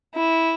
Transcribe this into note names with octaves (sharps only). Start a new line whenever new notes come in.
E4